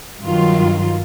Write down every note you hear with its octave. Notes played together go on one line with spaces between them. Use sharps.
G2 D#3 F#3 F4